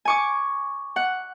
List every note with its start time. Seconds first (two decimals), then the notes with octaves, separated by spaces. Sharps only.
0.05 G#5 C#6 D6
0.96 F#5